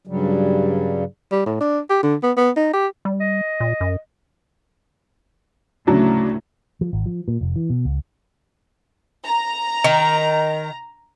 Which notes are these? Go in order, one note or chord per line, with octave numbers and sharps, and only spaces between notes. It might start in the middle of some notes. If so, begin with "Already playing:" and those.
G2 C#3 F#3 G3
G3
A2
D4
G4
D3
B3
B3
D#4
G4
G3
D#5
A#2
F#2
D2 A2 C#3 F#3 D4
F3
G#1
F3
A#2
F1
E3
B2
C#2
A#5
D#3